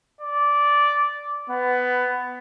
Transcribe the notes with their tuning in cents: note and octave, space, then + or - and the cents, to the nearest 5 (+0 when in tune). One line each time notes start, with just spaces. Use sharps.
D5 -10
B3 +15